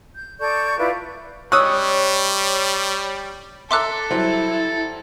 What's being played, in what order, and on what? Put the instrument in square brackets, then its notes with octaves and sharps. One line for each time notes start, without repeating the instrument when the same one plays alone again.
[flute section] G6
A4 D5 C#6 G6
E4 F4 B4 D5
[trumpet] G3 [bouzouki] C#4 C#5 D#5 [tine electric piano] C#6 [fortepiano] D#6 E6 F#6
[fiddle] A4 [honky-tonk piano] E5 A#5 E6 [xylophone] C6 D6 F#6
[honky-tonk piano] F#3 G3 C5 [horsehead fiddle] E4